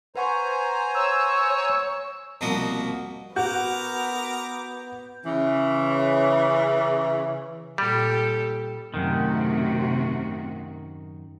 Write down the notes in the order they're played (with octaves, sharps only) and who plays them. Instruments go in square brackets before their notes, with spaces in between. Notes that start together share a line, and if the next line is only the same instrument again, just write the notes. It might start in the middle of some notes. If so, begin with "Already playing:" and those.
[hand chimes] B4 F#5 C#6 [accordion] C5 G#5 A#5
[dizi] C#5 [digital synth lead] E6
[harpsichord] C2 B2 F3 A#3 F#4 D#5
[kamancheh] B3 [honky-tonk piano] F#4 [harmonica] A#4 A#5 D6 [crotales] G6
[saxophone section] C#3 E3
[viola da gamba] A#2 G4 A4 [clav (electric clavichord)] G3
[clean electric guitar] F#2 D#3 [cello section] A2 C3 F#4